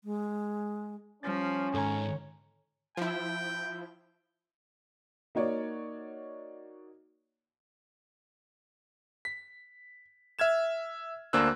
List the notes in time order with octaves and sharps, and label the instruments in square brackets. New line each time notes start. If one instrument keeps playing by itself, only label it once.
[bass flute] G#3
[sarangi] F3 [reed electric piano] G3 F6 A6 [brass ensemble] C#4
[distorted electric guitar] G#2 D#3 [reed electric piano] A4 G#5 A#5 [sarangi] C#5
[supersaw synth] F3 E4 [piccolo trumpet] G5
[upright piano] A#3 D#4 F#4 C#5 D5
[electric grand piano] B6
E5 F6 G#6 E7
D2 A#3 D4 C5 E6 F#6